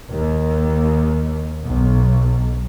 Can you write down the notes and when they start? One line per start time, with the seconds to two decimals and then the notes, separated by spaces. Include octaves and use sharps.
0.13 D#2
1.67 B1